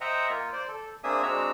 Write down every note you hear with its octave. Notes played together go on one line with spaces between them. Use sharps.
C5 D#5 E5 F#5 G5 A#5
A#3 F4
C5 D5
A4
A#3 C4 D4 G#4 E5 D#6
G#3 C4 D4 F#4 A#5 E6